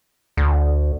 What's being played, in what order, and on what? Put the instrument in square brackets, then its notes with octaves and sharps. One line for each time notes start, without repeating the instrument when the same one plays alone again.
[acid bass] D2